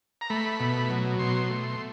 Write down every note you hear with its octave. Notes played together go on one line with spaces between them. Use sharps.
A#5
A3 B5
B2
F#3
B2 C6
A3